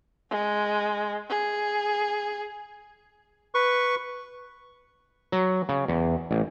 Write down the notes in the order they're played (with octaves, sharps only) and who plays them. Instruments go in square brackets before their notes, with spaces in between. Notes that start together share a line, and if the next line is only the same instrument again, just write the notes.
[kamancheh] G#3
G#4
[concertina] B4 C#6
[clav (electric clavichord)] F#3
C#3
E2
A1